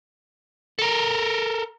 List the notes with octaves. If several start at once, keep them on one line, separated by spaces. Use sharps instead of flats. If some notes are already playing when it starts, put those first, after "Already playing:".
A4 A#4